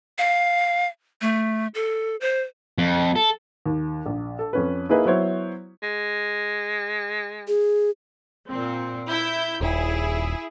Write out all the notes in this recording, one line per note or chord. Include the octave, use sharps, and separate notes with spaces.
F5
A3
A4
C5
F2
A4
D#2
A#1
A4
F2 C#4 B4
A#3 D#4 E4 G#4 B4 D#5
F#3 B3 E4 C5 C#5
G#3
G#4
A#2 C4
E4 G6
D#1 E4 G#4